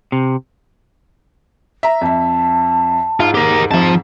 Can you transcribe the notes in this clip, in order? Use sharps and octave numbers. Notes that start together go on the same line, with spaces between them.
C3
E5 A#5
F2 E5 A5
G#2 F4
G4 A#4
F2 G#2 F3 A5